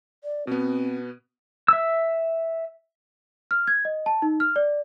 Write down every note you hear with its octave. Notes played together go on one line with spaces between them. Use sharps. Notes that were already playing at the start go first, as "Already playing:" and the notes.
D5
B2 B3 C4
E5 E6
F6
G#6
D#5
A5
D#4
F6
D5